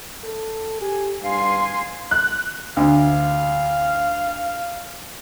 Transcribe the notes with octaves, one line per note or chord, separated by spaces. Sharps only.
A4
G4 G#5
G2 F5 G#5 C6
F#6
D2 F5